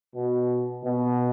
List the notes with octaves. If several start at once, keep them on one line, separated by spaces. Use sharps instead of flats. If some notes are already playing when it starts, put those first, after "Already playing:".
B2
B2